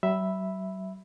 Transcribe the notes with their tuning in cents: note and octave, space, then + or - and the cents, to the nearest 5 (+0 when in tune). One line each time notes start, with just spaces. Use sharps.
F#3 +45 E5 +0 B5 +0